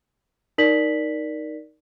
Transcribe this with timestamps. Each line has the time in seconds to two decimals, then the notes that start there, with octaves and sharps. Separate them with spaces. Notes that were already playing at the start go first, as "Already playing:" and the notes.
0.58 D#4 A#4 D5 B6 F#7